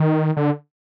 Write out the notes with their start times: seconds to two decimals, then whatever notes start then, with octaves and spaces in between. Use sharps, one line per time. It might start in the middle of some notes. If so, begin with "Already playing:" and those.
Already playing: D#3
0.37 D3